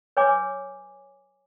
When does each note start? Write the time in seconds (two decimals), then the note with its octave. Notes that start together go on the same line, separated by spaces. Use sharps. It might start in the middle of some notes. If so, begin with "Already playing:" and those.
0.17 B4 C#5 G#5 D6